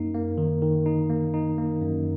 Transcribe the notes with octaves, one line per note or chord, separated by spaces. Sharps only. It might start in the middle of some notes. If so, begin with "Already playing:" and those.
Already playing: F#2 A#3 D#4
A#3
D#3
D#3
D#4
A#3
D#4
A#3
F#2